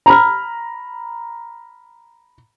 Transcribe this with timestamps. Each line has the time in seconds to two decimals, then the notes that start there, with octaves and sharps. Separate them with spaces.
0.06 A#5 B5 F6